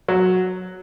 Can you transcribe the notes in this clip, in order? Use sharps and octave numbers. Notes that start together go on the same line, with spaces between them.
F#3